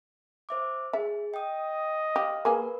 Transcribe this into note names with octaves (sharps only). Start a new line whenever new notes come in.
C5 E5 D6
G#4 E5
D#5 G5 D#6
G4 F5
A#3 G#4 A#4 B4